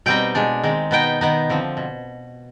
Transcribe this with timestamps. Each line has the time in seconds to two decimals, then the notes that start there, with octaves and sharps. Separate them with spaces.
0.06 B2 G3 C4 D#4 G5
0.35 B2 G#3 D4
0.63 D#3 G#3 C4
0.91 B2 B3 D#4 G5
1.21 D#3 B3 D#4
1.49 D3 F3 C4
1.77 B2